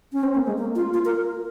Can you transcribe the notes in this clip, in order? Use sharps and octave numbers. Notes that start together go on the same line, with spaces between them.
C#4
C4
A#3
G#3
A#3
F4
F4
A#4